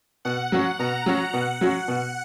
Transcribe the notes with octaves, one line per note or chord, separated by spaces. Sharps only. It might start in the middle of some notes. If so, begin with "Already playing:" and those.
B2 F#5
F#3 C#4 F#4
B2 A#5
F#3 C#4 F#4
B2 F#5
F#3 C#4 F#4
B2